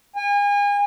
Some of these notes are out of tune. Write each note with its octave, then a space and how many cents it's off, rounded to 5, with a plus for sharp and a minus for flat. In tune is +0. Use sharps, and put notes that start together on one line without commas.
G#5 -35